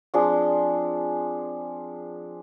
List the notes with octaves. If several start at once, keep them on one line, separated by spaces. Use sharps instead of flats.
F3 C4 D4 G#4